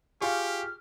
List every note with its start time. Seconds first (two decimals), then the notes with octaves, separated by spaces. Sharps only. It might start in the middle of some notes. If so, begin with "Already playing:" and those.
0.21 F4 G4 G#4 C#6 F6